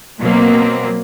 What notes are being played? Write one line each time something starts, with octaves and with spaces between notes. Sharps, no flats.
B2 F#3 A#3 C4